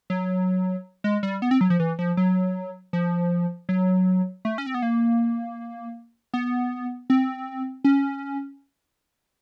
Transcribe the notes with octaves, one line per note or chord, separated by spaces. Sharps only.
F#3
G#3
G3
B3
C4
F#3
F3
E3
F3
F#3
F3
F#3
A3
C#4
C4
B3
A#3
B3
C4
C#4